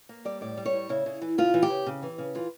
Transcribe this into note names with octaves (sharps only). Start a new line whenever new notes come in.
A#3
G3 D5
A2 D5
G3
C#5
A2
C#3 E4
C#3
E3
C#3 F4
E3
G4
C#3
C#3
E3
C#3
E3 F4